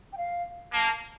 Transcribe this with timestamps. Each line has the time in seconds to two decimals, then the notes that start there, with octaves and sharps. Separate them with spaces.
0.12 G5
0.17 F5
0.73 A#3 A5